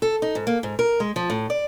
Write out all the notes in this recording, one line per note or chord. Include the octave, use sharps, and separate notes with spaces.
A4
D#4
G#2
A#3
G#2
A#4
G#3
F3
A2
D5